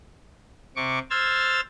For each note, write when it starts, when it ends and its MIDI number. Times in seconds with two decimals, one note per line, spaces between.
0.76 0.99 48
0.76 0.99 85
0.76 0.99 86
1.10 1.61 72
1.10 1.61 88
1.10 1.61 89
1.10 1.61 92
1.10 1.61 93